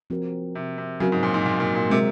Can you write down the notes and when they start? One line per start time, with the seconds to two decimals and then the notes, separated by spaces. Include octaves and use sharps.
0.10 F3 C4 F#4 A#4
0.55 C3
0.78 C3
1.00 C#3 F#3 C4 F#4 A#4
1.12 G#2
1.23 A#2
1.34 G#2
1.46 A#2
1.60 A#2
1.75 A#2
1.90 C3 G#3 C4 F#4 A#4